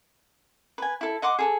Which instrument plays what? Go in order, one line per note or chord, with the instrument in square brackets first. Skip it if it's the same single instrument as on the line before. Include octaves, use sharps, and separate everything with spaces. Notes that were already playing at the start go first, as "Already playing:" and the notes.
[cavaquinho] B4 G#5
E4 A4
D#5 F#5 C6 D6
G#4 A4